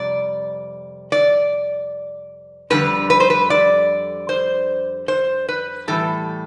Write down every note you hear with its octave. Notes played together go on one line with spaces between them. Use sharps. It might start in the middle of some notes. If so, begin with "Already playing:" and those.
Already playing: F2 C3 G3 D5
D5
F2 D3 G3 B4
B4
C5
B4
D5
C5
C5
B4
A2 E3 G3 A4